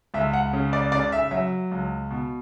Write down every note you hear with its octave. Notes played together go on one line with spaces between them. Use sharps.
C#2 E5
F#5
C#3
D5
C#3 D5
E5
F#3 E5
C#2
B2